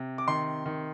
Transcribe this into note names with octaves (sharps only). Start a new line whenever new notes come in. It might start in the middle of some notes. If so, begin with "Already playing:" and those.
Already playing: C3
D6
D#3 C6
D#3